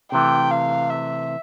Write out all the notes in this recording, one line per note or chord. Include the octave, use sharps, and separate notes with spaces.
C3 E3 A3 G5
F5
E5